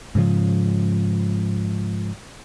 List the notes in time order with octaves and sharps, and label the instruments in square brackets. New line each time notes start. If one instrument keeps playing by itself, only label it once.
[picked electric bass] G#2 C#3 F3